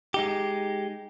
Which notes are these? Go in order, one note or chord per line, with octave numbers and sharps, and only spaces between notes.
G#3 D#4 G4